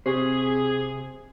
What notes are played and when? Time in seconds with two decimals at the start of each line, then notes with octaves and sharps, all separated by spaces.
0.06 C3 C4 G4 G#4 C5 C7